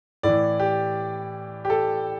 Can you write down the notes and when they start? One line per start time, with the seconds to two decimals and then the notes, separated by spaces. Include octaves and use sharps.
0.23 A2 E3 D5
0.60 G4
1.65 G4
1.70 A4